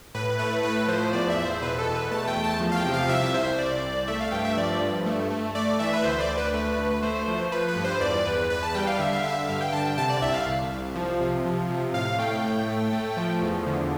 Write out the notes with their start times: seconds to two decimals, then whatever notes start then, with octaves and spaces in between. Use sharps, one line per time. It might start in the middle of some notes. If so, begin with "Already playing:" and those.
0.15 A2 B4
0.39 A3 B4
0.63 A2 B4
0.88 F3 C5
1.13 E2 D5
1.30 E5
1.38 E2
1.45 C5
1.62 B2 B4
1.78 A4
1.87 E2
1.95 B4
2.11 A3 A5
2.27 G5
2.36 E2
2.44 A5
2.60 F3
2.72 F5
2.77 G5
2.85 C3
2.94 F5
3.09 C2 E5
3.34 C2 C5
3.58 C2 D5
3.83 C2
4.08 A3 E5
4.20 F5
4.32 G2 G5
4.45 E5
4.57 F3 D5
4.81 G2
5.06 A3
5.30 A3
5.55 A3 D5
5.79 E3 E5
5.93 B4
6.04 D2 C5
6.20 D5
6.29 D2
6.37 B4
6.54 A3 B4
6.78 D2
7.02 A3 C5
7.27 F3
7.52 F3 B4
7.68 B4
7.76 G2
7.84 C5
8.00 E2 D5
8.25 E2 B4
8.50 E2 B4
8.63 A5
8.75 G3 G5
8.87 F5
8.99 D3 E5
9.13 F5
9.24 D3 E5
9.48 G2 F5
9.61 G5
9.72 D3 A5
9.85 G5
9.98 C3 A5
10.09 D5
10.22 C2 E5
10.34 F5
10.47 C2
10.72 C2
10.95 F3
11.20 C3
11.45 F3
11.70 C3
11.94 A2 F5
12.18 A3 G5
12.44 A2
12.68 A3
12.92 A3
13.17 F3
13.41 E2
13.67 D3